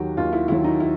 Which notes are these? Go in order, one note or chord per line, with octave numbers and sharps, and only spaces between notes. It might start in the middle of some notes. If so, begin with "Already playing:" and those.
Already playing: D#2 D#3 F#3 F#4 G4
D#2 F4
E4
D#3 F#3 E4
D#4
E4